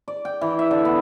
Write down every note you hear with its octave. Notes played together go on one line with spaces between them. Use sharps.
D5
G5
E3
E5
D3
B3